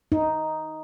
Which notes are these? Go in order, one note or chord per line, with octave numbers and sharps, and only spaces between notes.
D#4